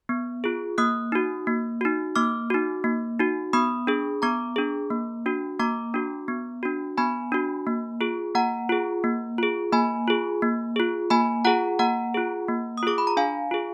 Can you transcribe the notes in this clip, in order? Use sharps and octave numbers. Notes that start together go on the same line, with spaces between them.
B3
F4 G#4
A#3 D#6 F#6
D#4 F#4
A#3
D#4 F#4
A#3 D6 F6
D#4 F#4
A#3
D#4 F#4
B3 B5 D#6
D4 G#4
B3 A#5 D6
D4 G#4
A#3
D4 F#4
A#3 A#5 D6
D4 F#4
B3
D4 F#4
B3 G#5 B5
D4 F#4
A#3
F4 G#4
A#3 F#5 A#5
F4 G#4
A#3
F4 G#4
A#3 G#5 B5
F4 G#4
A#3
F4 G#4
A#3 G#5 B5
F4 G#4 F#5 A#5
A#3 F#5 A#5
F4 G#4
A#3
D#6
F4 G#4 D6
B5
A#5
D4 F5 G#5
F4 G#4